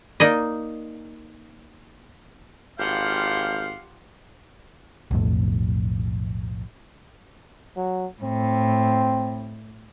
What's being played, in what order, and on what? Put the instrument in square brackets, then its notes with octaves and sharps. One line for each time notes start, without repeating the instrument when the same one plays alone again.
[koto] A#3 D#4 D5 D#5
[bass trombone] G#1 [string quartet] F4 G4 F#5 [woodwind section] F5 [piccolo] G6
[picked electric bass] B1 F2 A2
[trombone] F#3
[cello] A2 [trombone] C4